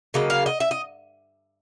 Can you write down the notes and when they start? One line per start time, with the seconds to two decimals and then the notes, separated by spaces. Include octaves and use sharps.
0.14 C#3 F#3 A#3 D#5
0.30 F5
0.46 D#5
0.60 E5
0.71 D#5